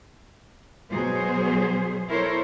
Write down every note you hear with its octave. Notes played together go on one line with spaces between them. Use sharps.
B2 F#3 G#4 C5
E4 A4 A#4 C5 C#5